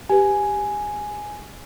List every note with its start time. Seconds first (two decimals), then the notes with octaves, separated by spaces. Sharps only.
0.10 G4 B4 G#5